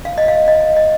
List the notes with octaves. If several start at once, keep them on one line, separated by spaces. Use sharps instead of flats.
F5
D#5
F5
D#5
D#5